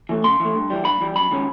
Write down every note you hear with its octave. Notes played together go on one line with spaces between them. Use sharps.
E3 A3
C#3 C6
E3 A3
G2
E3 G3
G2 B5
E3 G3
F#2 B5
D#3 G#3 C#4